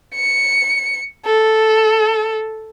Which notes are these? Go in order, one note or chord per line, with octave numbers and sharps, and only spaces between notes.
C#7
A4